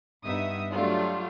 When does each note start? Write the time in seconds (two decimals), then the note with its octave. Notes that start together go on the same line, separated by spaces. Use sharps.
0.24 G2 B3 D#4 E5 D#6
0.73 F#3 G3 A3 D4 F4